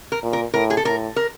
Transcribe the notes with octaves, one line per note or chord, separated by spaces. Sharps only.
A#4
A#2
A#4
A2 A#4
G#4
A4
A2 A#4
A#4